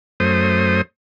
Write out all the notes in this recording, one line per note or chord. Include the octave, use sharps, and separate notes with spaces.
F#2 A3 C5 D#6